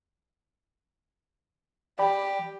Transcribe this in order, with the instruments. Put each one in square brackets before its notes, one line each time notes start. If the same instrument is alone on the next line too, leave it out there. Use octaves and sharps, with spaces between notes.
[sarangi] G4 [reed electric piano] D5 G5 B5